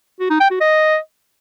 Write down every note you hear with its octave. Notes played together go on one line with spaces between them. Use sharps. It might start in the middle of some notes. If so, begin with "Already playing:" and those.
F#4
D#4
G5
F#4
D#5